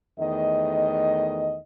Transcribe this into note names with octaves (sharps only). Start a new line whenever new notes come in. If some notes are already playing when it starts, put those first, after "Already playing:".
E2 D#3 A3 D#5